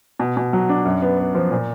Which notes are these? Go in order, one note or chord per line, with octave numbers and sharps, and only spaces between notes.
B2
B2
F#3
D4
F#2
B3
B3
F3
A#2